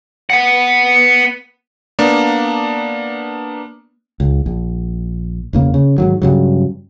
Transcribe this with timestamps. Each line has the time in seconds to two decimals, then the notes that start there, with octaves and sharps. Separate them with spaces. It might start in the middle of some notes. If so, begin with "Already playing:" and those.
0.30 B3 F#5
1.99 A#3 B3 D4
4.20 C#2
4.46 A#1
5.53 E1 C#3 A#3
5.74 C#3
5.98 G#2 D#3 F#3
6.22 G2 C#3 F#3